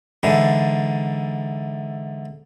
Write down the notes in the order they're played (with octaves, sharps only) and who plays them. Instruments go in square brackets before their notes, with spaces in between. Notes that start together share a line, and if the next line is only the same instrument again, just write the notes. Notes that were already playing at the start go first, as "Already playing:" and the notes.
[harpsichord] G#2 D3 E3